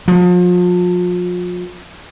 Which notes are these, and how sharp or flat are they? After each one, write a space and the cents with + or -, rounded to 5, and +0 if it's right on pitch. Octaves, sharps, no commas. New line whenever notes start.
F3 +35